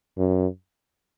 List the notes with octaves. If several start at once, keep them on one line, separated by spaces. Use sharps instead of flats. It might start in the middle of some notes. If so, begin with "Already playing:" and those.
F#2